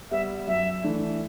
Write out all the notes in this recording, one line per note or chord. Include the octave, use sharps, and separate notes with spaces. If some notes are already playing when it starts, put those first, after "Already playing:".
G3 B3 E5
F#2 E5
E3 A3 D4